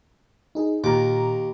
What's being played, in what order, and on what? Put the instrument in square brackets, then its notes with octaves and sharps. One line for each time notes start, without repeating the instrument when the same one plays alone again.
[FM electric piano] D#4 G#4
[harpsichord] D#2 D6 [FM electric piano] A#2 A#5